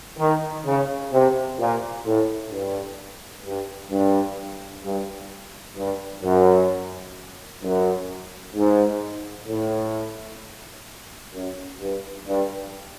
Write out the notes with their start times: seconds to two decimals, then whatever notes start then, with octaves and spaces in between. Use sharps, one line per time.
0.19 D#3
0.66 C#3
1.13 C3
1.59 A#2
2.05 A2
2.51 G2
3.45 G2
3.91 G2
4.84 G2
5.76 G2
6.23 F#2
7.63 F#2
8.55 G#2
9.48 A2
11.34 F#2
11.81 G2
12.27 G2